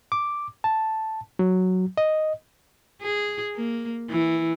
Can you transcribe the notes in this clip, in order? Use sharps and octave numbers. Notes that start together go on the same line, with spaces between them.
D6
A5
F#3
D#5
G#4
A#3
E3